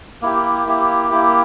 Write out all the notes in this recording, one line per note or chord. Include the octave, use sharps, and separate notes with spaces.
A#3 E4 G4
A#3 E4 G4
A#3 E4 G4